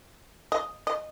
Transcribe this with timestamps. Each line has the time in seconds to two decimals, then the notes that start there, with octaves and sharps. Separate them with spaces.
0.52 D#5
0.87 D#5